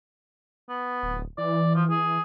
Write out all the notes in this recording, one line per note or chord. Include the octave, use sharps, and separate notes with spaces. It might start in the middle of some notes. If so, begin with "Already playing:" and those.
B3
D1
E3 D5
F3
G#4